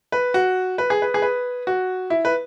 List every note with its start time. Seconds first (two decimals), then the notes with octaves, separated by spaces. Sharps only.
0.12 B4
0.34 F#4
0.78 B4
0.90 G#4
1.02 B4
1.14 G#4
1.22 B4
1.67 F#4
2.10 E4
2.25 B4